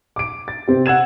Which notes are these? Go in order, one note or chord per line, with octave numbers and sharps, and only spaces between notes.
D6 D7
A6
C3 C4 G4
F#5 E6 G#6 E7